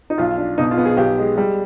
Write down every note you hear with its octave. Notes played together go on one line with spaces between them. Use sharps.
D#4
B1 F4
D4
B2 D#4
F4
B3
G#4
B1 G4
G#3
G3